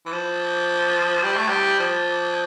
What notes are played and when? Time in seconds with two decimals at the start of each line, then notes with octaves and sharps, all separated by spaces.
0.06 E3
0.12 F3
1.23 G3
1.37 A3
1.49 G3
1.79 F3